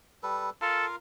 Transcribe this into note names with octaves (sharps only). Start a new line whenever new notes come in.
G3 A4 B4
F4 A4 A#4 F5